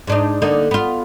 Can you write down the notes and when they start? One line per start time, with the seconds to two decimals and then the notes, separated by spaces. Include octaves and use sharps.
0.07 G#2 D4 D#4
0.42 D3 A#3 D#4
0.71 B3 F4